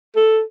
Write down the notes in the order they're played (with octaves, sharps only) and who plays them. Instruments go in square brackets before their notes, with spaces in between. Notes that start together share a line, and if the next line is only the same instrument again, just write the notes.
[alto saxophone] A4